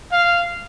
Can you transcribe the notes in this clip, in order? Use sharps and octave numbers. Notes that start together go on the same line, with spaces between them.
F5